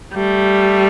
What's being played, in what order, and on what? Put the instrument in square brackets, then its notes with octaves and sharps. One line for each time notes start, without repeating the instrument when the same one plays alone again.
[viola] G3 [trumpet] A3